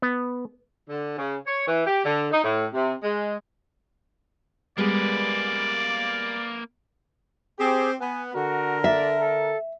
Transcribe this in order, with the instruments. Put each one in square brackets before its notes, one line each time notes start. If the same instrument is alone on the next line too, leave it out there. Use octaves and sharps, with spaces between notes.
[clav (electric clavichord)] B3
[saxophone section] D3
C#3
C#5
E3
G4
D3
D#4
A2
C3
G#3
[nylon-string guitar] G3 G#3 B3 [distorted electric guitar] A#3 B4 [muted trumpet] D5
[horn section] C4 G4 [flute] G#4
[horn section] B3 [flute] G#5
[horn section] D3 A#4 [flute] F#4
[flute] D5 [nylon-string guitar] E5
[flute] A4